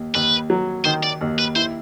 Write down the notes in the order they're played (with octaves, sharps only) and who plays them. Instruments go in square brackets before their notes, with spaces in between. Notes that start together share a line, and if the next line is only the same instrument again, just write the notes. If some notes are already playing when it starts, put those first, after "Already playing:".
Already playing: [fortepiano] D#2
[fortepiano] D#2 [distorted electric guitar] B4
[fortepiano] F#3
[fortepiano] D#3 [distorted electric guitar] C5
[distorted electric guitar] D5
[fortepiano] D#2
[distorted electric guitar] B4
[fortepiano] E4 [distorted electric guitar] C5